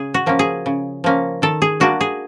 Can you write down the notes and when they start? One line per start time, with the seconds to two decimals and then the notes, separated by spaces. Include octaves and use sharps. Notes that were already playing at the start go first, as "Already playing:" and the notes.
Already playing: C#3 G#4
0.14 F#4
0.26 F3 A#3 C#4
0.39 G#4
0.66 C#3
1.04 F3 A#3 C#4
1.42 D#3 A4
1.62 G#4
1.80 G3 A#3 D4 F#4
2.01 G#4